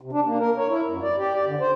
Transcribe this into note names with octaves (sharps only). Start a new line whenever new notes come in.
C3
D4
A#3
A#4
C#5
E4
F#2
D5
G4
D5
D3
C5